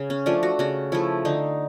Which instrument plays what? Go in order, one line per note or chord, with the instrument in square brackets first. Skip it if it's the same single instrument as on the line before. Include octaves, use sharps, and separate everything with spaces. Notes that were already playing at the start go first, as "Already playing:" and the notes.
Already playing: [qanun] C#3
C#4
F3 A3 D4
F#4
C#3 F#4
F3 A3 E4
D3 D#4